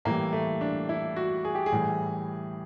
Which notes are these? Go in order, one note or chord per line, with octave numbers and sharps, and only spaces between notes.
A2 E3 G3 A#3
A3
D4
E4
F#4
G#4
G4
G#4
A2 E3 G3